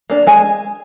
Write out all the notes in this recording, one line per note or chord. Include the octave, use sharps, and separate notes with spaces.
A#3 D4
G#3 G#5